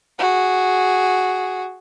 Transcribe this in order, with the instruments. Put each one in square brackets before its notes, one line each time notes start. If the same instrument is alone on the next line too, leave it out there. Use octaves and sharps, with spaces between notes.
[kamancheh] F#4 G#4